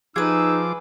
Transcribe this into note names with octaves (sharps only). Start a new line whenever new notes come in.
F3 D#4 G#4 B4 D6 E6